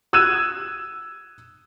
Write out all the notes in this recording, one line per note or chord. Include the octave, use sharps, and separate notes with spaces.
D#6 E6 F#6 G#6 D#7 E7